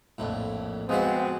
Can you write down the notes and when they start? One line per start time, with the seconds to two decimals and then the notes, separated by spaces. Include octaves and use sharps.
0.18 A#1 F2 A2
0.89 F3 G#3 B3 C4 F#4